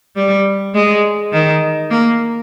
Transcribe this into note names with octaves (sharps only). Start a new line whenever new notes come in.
G3
G#3
D#3
A#3